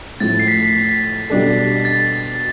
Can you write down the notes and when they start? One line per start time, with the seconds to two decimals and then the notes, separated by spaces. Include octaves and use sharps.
0.20 A2 F3 A3 A6
0.39 C7
0.48 B6
0.75 B6
1.30 B2 G3 D4 A4
1.85 A6